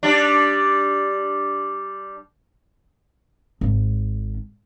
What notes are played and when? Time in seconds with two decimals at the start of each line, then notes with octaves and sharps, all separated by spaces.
0.03 G3 D4
3.61 G#1